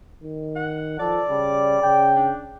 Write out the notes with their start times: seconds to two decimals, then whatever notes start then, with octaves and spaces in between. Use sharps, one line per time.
0.24 D#3
0.56 F#5
0.99 F3 A4 D5
1.30 C#3 G3
1.83 C#3 G5
2.16 D4